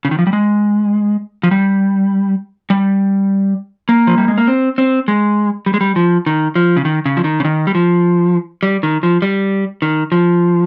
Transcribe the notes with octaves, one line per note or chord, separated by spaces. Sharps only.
C#3
D#3
F3
G3
G#3
F3
G3
G3
A#3
F3
G3
G#3
A#3
C4
C4
G#3
G3
G#3
G3
F3
D#3
F3
C#3
D#3
C#3
F3
D#3
C#3
D#3
G3
F3
G3
D#3
F3
G3
D#3
F3